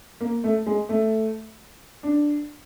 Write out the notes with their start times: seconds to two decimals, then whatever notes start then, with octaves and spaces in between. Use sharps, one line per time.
0.21 A#3
0.44 A3
0.67 G#3
0.89 A3
2.03 D4